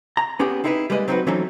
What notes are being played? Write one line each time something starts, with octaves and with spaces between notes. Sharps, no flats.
A#5
B3 C#4 E4 G4 G#4
C4 D#4 E4 G#4 A#4 B4
G3 G#3 A#3 B4 D#5
F#3 C4 D#4 F4 F#4 B4
E3 F#3 A3 C4 C#4 D#4